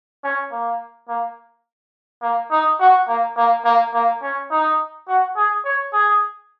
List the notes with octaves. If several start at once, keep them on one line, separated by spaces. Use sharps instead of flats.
C#4
A#3
A#3
A#3
D#4
F#4
A#3
A#3
A#3
A#3
C#4
D#4
F#4
G#4
C#5
G#4